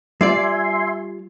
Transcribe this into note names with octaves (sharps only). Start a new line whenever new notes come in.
G3 F4 D5 E5 G#5 C6